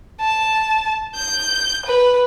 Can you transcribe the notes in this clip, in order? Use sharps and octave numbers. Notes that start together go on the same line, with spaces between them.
A5
G6
B4